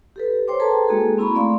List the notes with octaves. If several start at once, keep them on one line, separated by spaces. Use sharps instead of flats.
G4 A4 B4
C5 C#5 G5 C6 D6
G#4 A4 B4 G5 A5 A#5
G#3 A#3 D#4 F#4 G#4 A4
A#3 C4 E4 A#5 B5 C#6
A3 D5 F5 C6